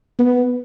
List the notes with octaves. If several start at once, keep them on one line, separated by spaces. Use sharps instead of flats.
B3